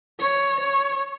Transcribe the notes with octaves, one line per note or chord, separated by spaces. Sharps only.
C#5
C#5